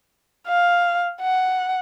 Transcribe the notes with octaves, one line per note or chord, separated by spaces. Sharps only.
F5
F#5